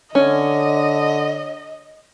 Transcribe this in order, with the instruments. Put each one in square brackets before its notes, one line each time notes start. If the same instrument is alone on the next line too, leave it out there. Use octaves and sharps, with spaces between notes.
[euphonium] D3 [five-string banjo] C#4 [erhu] D#5